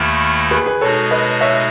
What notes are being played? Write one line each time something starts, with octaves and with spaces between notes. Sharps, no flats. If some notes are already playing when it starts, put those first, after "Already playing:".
Already playing: D#2 D#3 A3 E4 B4
G#4 B4
G#4 B4
B2 G#3 D#4 F#4 A4 C#5
B4 D#5
C#5 E5